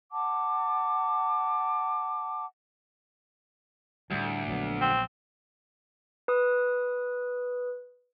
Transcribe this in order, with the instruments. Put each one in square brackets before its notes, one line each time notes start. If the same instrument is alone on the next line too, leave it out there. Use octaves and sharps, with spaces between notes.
[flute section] F#5 A5 D6
[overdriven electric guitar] D2 [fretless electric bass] A2 G3
[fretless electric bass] A#1 F#3 B3
[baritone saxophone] C4
[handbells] B4 D#6